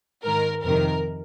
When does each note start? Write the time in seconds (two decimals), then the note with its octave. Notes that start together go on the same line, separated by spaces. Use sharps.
0.23 G#2 D#3 A#4
0.64 F2 C3 D#3 A#4